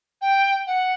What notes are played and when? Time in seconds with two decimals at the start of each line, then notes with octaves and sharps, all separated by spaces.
0.22 G5
0.67 F#5